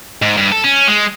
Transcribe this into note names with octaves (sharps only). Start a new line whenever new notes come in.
G#2
G2
A4
C#4
G#3